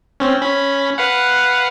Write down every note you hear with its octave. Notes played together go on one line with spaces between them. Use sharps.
C4 C#4
C#4 B5
B4 F5 F#5